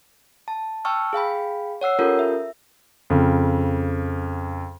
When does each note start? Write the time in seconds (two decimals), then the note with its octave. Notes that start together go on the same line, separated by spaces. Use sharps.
0.48 A5
0.85 G5 A5 C#6 E6 F6
1.13 G#4 F5 G5 B5
1.81 C#5 F#5 E6 C7
1.99 C#4 F4 G4 A4 A#4 G6
2.19 E5
3.10 F2 C#3